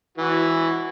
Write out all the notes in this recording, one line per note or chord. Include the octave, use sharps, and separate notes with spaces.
E3 F#4